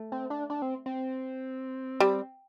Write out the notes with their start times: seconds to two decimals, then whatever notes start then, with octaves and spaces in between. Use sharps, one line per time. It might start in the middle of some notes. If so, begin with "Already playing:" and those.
Already playing: A3
0.12 C4
0.30 D4
0.50 D4
0.62 C4
0.86 C4
2.00 G3